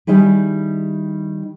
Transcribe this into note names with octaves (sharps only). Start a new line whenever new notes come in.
D#3 G3 D#4 E4 G#4